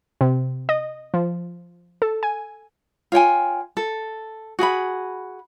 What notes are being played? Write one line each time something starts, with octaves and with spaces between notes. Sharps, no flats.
C3
D#5
F3
A4
G#5
F4 C#5 G5 G#5
A4
F#4 G#4 F#5 B5